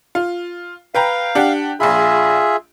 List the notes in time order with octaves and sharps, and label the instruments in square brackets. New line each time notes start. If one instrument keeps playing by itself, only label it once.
[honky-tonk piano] F4
[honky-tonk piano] B4 G5 A#5 [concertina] F5
[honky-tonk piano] D4 G4 F#5
[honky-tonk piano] A#1 B5 [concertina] F4 G#4 E5